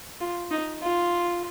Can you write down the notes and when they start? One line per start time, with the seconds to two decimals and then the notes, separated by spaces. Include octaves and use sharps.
0.20 F4
0.50 D#4
0.81 F4